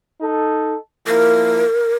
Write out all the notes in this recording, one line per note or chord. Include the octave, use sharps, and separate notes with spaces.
D#4 A4
F3 A#3 E4 A#4